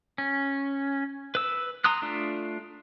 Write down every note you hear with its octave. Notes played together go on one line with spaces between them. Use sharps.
C#4
B4 E6
A#5 C6 D#6 F#6
A3 D4 F4